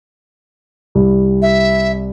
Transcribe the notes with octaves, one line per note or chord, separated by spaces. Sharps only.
C2
E5